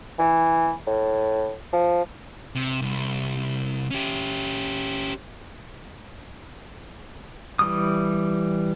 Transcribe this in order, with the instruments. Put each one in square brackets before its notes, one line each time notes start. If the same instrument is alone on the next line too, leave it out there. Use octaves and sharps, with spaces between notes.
[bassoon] E3
A2
F3
[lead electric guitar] C3
C2
C#4 G4
[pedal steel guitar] E3 G3 D#6